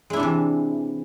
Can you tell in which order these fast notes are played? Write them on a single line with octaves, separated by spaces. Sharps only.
G#3 E4 D4 C3 E3